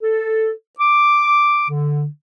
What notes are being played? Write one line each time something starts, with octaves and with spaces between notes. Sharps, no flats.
A4
D6
D3